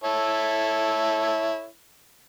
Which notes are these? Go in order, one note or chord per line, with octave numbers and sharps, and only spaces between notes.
E4 A4 C#5